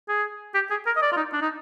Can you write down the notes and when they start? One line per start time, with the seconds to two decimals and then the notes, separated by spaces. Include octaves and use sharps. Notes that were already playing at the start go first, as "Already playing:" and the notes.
0.08 G#4
0.54 G4
0.70 G#4
0.86 A#4
0.96 D#5
1.02 D5
1.12 F4
1.17 D#4
1.33 D4
1.41 D#4